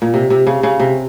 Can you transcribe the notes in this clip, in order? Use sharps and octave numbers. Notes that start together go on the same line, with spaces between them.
A#2
C3
C3
C#3
C#3
C3